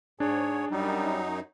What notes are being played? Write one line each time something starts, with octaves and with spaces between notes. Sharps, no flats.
G#2 D4 G#4 C#5
F#2 F#3 G3 D#4